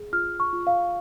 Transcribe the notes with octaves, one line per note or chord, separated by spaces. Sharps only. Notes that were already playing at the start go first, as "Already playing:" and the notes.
Already playing: G#4
F4 F6
C#6
F4
F5